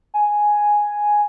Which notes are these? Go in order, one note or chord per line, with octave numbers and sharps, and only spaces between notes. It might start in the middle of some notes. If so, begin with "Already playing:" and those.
G#5